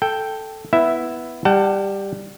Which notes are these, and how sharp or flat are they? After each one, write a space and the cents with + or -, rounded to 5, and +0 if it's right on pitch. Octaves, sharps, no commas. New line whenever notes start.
A4 +0 G5 +0
B3 +0 E4 +0 E5 +0
G3 +10 F#5 +45 A5 +25